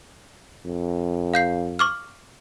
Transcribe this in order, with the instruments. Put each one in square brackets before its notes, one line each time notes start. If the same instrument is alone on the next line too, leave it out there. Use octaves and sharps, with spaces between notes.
[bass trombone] F2
[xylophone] F5 G6 C7
C#6 D6 F6